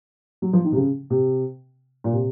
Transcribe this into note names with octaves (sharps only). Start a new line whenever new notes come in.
F#3
F3
D#3
C3
C#3
C3
A#2
C3